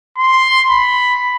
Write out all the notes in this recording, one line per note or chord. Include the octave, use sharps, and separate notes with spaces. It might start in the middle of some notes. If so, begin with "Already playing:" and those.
C6
B5